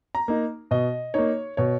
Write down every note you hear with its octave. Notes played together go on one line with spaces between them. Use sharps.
A#5
A#3 D#4
B2 D#5
A#3 D#4 C#5
B2 C#5